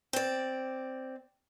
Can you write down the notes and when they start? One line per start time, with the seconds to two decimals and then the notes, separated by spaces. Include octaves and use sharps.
0.13 C4 D5